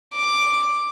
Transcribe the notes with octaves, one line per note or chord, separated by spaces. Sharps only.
D6